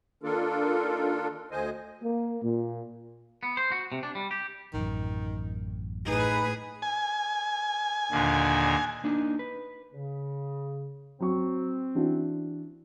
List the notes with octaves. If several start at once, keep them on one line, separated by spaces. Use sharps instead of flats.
D#3 A#3 D4 F4 A4 A#4
D2 D3 C5 D#5 G#5
A#3
A#2
B3
C5
F#4
C3
D4
G3
G4
A1 F#2 D#3
A2 D#4 G#4 B4
G#5
D#2 A#2 D3
A#3 D4 D#4
B4
C#3
F#3 C4 C#6
E3 D4 F#4